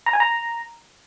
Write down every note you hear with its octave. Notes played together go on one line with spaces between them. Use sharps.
A#5
G#5
A#5